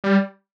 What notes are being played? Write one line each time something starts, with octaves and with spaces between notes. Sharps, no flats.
G3